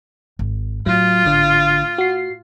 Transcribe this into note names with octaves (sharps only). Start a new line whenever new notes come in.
G#1
A2 F#3 F4
G#1 D3 D4
F#4 C7